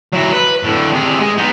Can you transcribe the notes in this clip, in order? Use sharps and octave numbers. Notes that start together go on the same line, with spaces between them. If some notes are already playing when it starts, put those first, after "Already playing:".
F#3 E4
B4
A2 D3
C3 G#4
G#3
B3 D#4